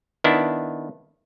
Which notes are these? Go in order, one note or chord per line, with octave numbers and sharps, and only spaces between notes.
D#3 B3 D4 E4